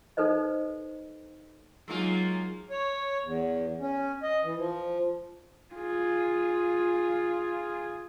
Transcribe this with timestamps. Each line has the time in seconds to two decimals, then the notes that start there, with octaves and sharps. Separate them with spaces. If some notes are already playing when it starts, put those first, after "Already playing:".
0.17 D#4 A4 B4 C5 D#5
1.88 F#3 G#3 A#3 D#4 F4
2.70 C#5
3.23 E2
3.80 C#4
4.23 D#5
4.43 E3
4.57 F3
5.74 F4 G#4